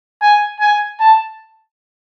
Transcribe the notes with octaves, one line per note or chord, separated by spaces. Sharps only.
G#5
G#5
A5